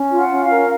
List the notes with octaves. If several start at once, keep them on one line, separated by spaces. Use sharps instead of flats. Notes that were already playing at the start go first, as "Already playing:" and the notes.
Already playing: C#4
F4
F#5
C#4
F5
A#4